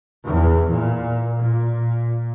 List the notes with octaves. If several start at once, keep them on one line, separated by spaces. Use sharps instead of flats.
E2
A#2
A#2